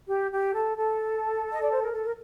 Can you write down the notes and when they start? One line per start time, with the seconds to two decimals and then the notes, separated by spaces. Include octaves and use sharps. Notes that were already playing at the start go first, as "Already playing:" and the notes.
0.08 G4
0.31 G4
0.54 A4
0.77 A4
1.52 D#5
1.61 D5
1.71 C5
1.82 A#4
1.92 A4
2.04 A#4